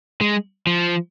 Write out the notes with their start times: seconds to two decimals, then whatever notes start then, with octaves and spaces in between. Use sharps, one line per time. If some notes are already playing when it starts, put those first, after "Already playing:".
0.21 G#3
0.67 F3